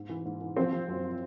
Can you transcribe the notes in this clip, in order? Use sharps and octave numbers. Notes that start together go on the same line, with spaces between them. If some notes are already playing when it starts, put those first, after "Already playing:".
Already playing: G#2
E3
G#2
E3
F3 C4 C5
F3
F#2